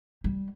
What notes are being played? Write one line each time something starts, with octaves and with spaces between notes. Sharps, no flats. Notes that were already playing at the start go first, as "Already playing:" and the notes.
G3